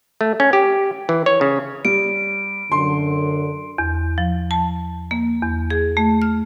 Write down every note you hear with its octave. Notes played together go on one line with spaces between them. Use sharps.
A3
C#4
G4
E3
C#5
C#3
G3 D7
F#2 D3 C6
E2
F3
A5
A#3
E2
G#4
A3
F6